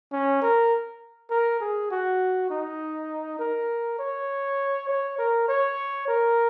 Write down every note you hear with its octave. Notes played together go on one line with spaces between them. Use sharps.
C#4
A#4
A#4
G#4
F#4
D#4
A#4
C#5
C#5
A#4
C#5
A#4